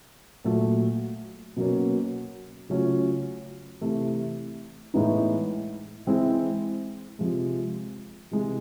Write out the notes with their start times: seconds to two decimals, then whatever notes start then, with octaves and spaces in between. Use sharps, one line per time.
0.44 A#2 F#3 A3
1.56 B2 F#3 A#3 C#4
2.69 C#3 F#3 A3 C#4 F4
3.81 C3 E3 A3
4.94 A2 E3 G#3 B3 D#4
6.07 E3 G#3 C4 E4
7.19 C3 F3 G#3
8.31 C3 E3 G#3